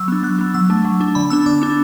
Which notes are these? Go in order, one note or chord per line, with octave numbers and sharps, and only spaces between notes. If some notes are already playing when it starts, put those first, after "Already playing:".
Already playing: F#3 E6
B3 D4
F#3 F#6
B3 D4
F#3 E6
A3 D4
F#3
A3 D4
D3 B5
B3 D4 E6
D3 D6
B3 D4